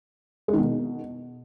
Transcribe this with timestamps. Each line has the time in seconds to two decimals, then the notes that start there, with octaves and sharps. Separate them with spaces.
0.48 G#3
0.53 D#3
0.58 B2